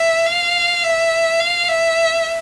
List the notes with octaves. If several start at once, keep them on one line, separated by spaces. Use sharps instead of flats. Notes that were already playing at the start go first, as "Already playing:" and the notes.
Already playing: E5
F5
E5
F5
E5